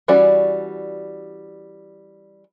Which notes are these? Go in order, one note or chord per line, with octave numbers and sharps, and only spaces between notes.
E3 G3 C#4 F#4 D5